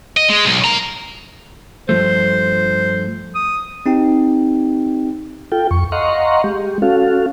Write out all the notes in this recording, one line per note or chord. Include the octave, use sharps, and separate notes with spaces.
D#5
G#3
B1
A#3 A#5
G2 F3 A3 C5
D#6
C4 D#4 G4 G5
F4 A4 G5
F2 C#6
D#5 F5 F#5 A#5 C6 C#6
G#3 G4
C#4 F#4 A4 F5